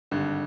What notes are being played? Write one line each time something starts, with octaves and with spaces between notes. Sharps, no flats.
G#1 G2 D3